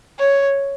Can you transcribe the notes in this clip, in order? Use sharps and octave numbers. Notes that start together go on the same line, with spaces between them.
C#5